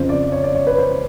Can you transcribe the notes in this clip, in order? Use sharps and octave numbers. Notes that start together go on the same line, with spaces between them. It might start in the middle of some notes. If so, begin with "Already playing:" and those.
Already playing: F2 C#3 F3 C5
D5
C#5
D5
C#5
B4
C5